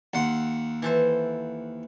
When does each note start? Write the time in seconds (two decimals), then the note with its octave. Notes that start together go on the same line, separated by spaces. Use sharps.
0.14 D#2 F#5 C6
0.82 E3 A4 C5